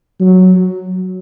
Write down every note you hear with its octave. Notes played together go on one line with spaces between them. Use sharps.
F#3